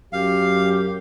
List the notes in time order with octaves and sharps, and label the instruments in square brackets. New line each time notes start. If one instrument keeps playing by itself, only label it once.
[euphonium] F#2 [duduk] G4 [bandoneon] F5